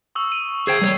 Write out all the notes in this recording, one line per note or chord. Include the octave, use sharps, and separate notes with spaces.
C#6 D#6 E6
D#7
G#4 C5 G5 G#6 C7
G3 C5 C#5